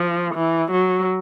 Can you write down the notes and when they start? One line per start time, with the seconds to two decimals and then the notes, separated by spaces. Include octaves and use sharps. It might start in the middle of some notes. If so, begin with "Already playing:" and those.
Already playing: F3
0.35 E3
0.71 F#3